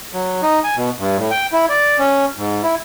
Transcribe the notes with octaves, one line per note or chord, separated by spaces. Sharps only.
F#3
D#4
G#5
B2
G2
A2
G5
E4
D5
C#4
G#2
E4